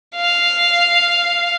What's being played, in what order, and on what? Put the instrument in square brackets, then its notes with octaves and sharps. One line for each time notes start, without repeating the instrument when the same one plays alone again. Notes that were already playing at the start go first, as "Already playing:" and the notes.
[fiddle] F5